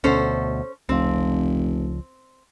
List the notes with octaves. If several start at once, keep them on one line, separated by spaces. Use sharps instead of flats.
D2 B2 C#4 A4 C5
F1 C#2 F3 C4